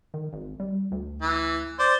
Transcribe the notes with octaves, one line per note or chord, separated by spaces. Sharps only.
D#3
G#1
G3
D2
E3
C5 D5